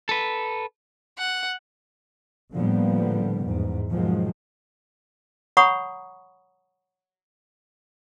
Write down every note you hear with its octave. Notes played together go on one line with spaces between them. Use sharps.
A4 B4
F#5
A2 D3 F3 G3 A#3 B3
E2 G#2
G#2 B2 D#3 F3 F#3 G#3
C#5 F#5 A#5 B5 C#6 D#6